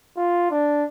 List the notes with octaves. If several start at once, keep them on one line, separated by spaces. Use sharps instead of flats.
F4
D4